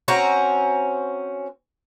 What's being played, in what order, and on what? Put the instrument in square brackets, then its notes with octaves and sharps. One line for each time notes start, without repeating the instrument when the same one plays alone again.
[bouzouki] C4 C#4 F#4 A#5